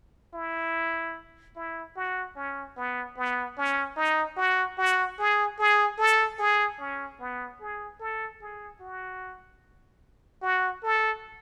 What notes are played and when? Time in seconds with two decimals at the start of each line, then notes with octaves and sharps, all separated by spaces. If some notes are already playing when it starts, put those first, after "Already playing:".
0.34 E4
1.56 E4
1.96 F#4
2.36 C#4
2.77 B3
3.17 B3
3.57 C#4
3.96 D#4
4.37 F#4
4.78 F#4
5.19 G#4
5.59 G#4
5.98 A4
6.39 G#4
6.79 C#4
7.20 B3
7.61 G#4
8.00 A4
8.41 G#4
8.80 F#4
10.42 F#4
10.83 A4